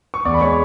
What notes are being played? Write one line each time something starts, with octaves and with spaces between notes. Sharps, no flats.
C#6
E2 D5 D6
B5
G#3 C#5 C#6